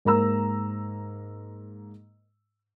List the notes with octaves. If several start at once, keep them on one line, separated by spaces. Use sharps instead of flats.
G#2 A#3 A#5 E6